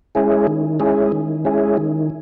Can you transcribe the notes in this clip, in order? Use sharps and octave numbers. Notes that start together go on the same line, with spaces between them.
G#3 C#4 E4 G#4
D#3
G#3 C#4 E4 G#4
D#3
G#3 C#4 E4 G#4
D#3